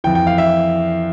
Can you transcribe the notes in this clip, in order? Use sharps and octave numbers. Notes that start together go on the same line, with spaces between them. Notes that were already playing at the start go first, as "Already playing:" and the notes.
F2 E3 G5
G5
F5
E5